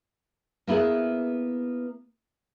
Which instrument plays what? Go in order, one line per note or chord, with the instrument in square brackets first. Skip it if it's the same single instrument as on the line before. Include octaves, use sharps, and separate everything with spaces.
[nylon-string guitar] A#3 B3 E4 G#4 B4